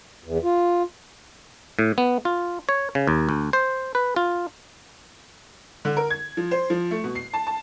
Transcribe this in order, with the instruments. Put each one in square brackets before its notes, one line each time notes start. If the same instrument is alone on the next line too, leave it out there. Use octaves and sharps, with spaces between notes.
[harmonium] E2
F4
[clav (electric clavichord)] A2
B3
F4
C#5
C#3
D#2
D2
C5
B4
F4
[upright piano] D3
A#4
G#6
F3
C5
F3
A3
B2
C7
A5
A5